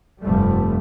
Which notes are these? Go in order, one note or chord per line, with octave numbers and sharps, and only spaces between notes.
F1 G2 F3 G3 A3